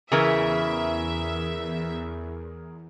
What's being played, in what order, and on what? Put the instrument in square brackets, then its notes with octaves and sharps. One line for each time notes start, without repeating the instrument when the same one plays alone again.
[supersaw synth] E2 [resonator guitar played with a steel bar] C#3 E3 E4 [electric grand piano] G#4 A#4 [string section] E5